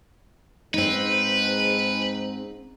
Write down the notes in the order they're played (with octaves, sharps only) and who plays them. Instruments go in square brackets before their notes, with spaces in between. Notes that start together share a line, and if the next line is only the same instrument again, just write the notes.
[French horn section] G#2 [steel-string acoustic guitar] C4 D#4 [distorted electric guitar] B4